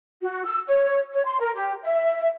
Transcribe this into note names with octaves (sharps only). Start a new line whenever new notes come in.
F#4
E6
C#5
C#5
C6
A#4
G4
E5